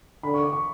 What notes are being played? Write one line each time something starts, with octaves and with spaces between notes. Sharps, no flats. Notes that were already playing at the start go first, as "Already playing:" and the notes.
D3 B5
C#6
D6
C#6